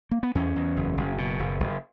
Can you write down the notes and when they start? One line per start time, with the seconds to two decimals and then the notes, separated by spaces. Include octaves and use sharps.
0.11 A#3
0.23 B3
0.35 E2 C#4
0.56 E2
0.77 F#1
0.97 F#1
1.18 B2
1.39 F#1
1.60 F#1